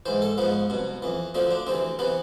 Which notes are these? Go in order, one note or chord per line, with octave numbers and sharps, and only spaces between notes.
G#2 E3 C5
A4
G#2 F3 B3
C2 B2
F2 E3
D2 D3 F3 C4
D4
D2 C3 E3 C4
C3 E3 B3